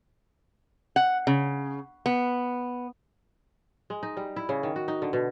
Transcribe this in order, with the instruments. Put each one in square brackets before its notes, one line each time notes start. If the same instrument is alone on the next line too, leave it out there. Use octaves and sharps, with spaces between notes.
[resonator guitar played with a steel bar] F#5
C#3
B3
[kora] G#3
D#4
G3
E4
C#3
D#3
F#4
D#4
D3
B2